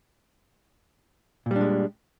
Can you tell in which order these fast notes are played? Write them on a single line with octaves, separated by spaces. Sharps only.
A#2 G3 D4 G#3